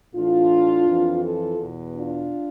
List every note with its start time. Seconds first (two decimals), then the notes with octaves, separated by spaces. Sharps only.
0.13 A2 E3 D4 F4
0.86 F2 E3
1.22 F4 A4
1.59 E2 B2
1.95 D4 F4